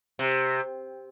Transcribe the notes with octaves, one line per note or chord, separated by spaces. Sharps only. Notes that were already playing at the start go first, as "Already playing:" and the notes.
C3